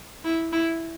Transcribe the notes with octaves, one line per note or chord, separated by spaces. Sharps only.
E4
E4